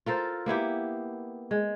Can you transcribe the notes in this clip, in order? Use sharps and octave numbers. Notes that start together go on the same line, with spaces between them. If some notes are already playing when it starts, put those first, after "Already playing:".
F4 A4 A#4 C5
A#3 B3 E4 G4
G#3